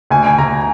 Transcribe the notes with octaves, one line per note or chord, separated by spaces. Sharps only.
D2 G#5
G#5
D2 A#5